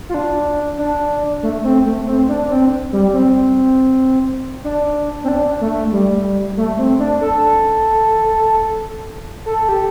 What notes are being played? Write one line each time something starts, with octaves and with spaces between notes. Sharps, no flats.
F4
D4
D4
A3
C4
A3
C4
D4
C4
G3
C4
D4
C4
D4
A3
G3
A3
C4
D4
A4
A4
G4